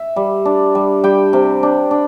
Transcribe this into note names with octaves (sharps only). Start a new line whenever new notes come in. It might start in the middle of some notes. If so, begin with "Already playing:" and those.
Already playing: E5
G3
D4
G3
G3 G5
C3
D4
D4